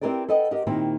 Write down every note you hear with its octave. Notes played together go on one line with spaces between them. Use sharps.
C4 E4 G4 A#4 B4 D5
A4 B4 D#5 F#5 G5
G4 A#4 D#5 F#5
A#2 D#3 A#3 C4 E4 G4